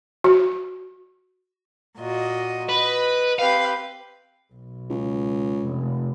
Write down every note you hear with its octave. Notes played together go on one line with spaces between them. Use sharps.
F#4
A#2 F#4 D#5
B4 D#5
C4 G4 B4 F5
B1
C#2
F1